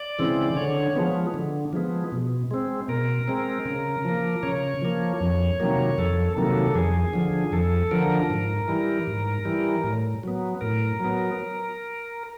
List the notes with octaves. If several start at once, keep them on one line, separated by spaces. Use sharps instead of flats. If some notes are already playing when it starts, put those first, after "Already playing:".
Already playing: D5
C#3 E3 G#3 C4
D3 C#5
F3 G#3 B3
D3
F3 G#3 B3
B2
G#3 C4
B2 A#4
G#3 C4
C#3
F3 A#3
C#3 C#5
F3 A#3
F2
C3 D#3 F#3 A#3
F2 A4
C3 D#3 F#3 A#3 A4
F2 G#4
D3 F3
F2 A4
D3 F3 A#4
G#2
E3 G3
G#2
E3 G3
A2
F#3 B3
A2 A#4
F#3 B3